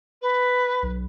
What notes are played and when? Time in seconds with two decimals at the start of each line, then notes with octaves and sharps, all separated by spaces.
0.22 B4
0.82 B1